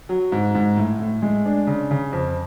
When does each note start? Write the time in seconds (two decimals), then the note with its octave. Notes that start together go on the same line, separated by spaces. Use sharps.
0.09 F#3
0.32 G#2
0.55 G#2
0.77 A2
0.99 A2
1.22 G#3
1.45 D4
1.67 C#3
1.91 C#3
2.13 F2